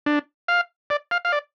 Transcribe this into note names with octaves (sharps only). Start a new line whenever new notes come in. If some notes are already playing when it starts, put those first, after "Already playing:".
D4
F5
D5
F5
F5
D5